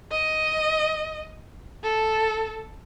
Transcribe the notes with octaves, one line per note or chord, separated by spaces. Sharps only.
D#5
A4